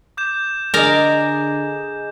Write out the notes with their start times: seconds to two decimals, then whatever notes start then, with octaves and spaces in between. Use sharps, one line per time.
0.17 D6 G6 E7
0.74 D3 G#4 A#4 D5 D#5